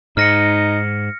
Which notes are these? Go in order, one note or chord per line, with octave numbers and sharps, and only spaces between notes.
G#2 D#4 F6 A#6 C#7